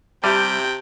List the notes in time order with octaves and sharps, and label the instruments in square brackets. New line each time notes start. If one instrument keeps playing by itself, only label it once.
[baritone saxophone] C3 [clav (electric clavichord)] G3 [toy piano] G4 E5 A5 [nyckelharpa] G5